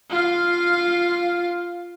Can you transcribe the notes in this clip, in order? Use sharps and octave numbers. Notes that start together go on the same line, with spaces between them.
F4 F5